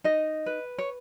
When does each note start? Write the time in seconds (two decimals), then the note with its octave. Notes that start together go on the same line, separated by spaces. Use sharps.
0.04 D#4 D#5
0.46 B4
0.78 C#5